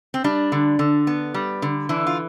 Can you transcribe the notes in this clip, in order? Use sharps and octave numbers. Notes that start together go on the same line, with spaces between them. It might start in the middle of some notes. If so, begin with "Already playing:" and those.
C4
G3 D4
D3
D3
B3
G3
D3
E3 D4
F4